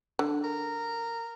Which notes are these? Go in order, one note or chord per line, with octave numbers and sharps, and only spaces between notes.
D3
A#4